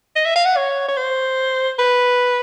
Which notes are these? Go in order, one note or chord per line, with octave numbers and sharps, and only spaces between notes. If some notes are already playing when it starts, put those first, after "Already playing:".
D#5
E5
F5
F#5
C#5
C#5
C5
B4